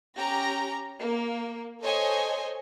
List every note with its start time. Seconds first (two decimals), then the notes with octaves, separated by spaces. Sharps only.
0.17 C#4 G4 A#5 A#6
1.00 A#3
1.82 A4 C5 C#5 D#5 G#5